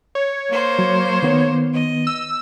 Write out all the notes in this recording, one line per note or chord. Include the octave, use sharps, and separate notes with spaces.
C#5
A#3 C5
F#3
D#3 B3
D#5
E6